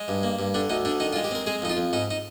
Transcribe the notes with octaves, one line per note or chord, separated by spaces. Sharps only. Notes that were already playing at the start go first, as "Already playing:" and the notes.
Already playing: G#3
G2
A#3
G2
D3 D4
D2 D#4
D3 D4
D#3 D#4
F4
G#3
G4
C4 A#4
G#3 G#4
F2 D#4
F4
F2
G#2 D#4
D#4